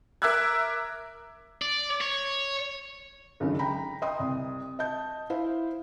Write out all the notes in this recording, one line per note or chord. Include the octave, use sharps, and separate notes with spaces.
A#4 E5 D6 E6 F#6 G#6
D5
C#5
C#2 F#2 D3 D#3
G5 A#5 B5
D#5 G5 C6 D#6
C2
D#5 A5 G6
E4 C5 F5